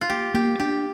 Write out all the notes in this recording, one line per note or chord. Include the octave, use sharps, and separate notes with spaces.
F4
A#3 G4
A#3 G4
D4 G4